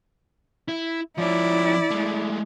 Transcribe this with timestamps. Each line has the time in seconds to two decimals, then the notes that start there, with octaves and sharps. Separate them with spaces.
0.68 E4
1.17 F3 C#4 E4 D5
1.91 G#3 A3